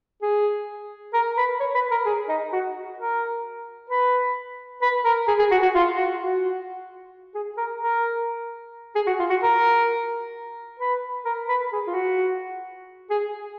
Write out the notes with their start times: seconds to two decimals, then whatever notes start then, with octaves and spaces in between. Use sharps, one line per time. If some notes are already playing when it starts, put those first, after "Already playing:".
0.22 G#4
1.14 A#4
1.38 B4
1.60 C#5
1.75 B4
1.91 A#4
2.06 G#4
2.29 D#4
2.53 F#4
2.98 A#4
3.90 B4
4.82 B4
5.05 A#4
5.28 G#4
5.39 G#4
5.51 F#4
5.62 F#4
5.75 F4
5.97 F#4
6.21 F#4
7.35 G#4
7.57 A#4
7.81 A#4
8.95 G#4
9.07 F#4
9.19 F4
9.30 F#4
9.43 A#4
10.80 B4
11.25 A#4
11.49 B4
11.73 G#4
11.87 F4
11.94 F#4
13.11 G#4